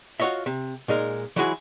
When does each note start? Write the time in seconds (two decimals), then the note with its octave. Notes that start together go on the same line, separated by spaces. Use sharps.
0.20 F4 F#4 A4 C#5 D#5 E5
0.46 C3
0.88 A#2 G#3 D#4 A#4
1.36 E3 F#3 G#3 E4 F#4 G#4